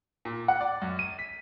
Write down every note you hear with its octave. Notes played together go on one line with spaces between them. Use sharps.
A#2
F#5
D5
F#2
D#7
B6